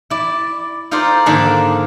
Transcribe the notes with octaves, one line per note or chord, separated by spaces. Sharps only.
E4 D5
D#4 F4 A4 A#4 C5 D5
G#2 D3 D#3 A#3 A5